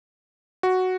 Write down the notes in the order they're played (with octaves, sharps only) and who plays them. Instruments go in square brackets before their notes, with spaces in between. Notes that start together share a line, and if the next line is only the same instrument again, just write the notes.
[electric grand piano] F#4